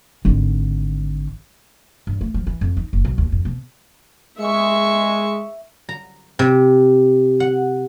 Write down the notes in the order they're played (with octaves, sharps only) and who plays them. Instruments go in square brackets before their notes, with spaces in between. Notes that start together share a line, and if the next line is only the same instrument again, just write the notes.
[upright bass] G#1 D3
G2
A3
F3
E3
F2
D#4
F#1
B1
D#2
F2
B2
[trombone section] G#3 [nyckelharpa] E5 C#6
[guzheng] A#5
C3
F#5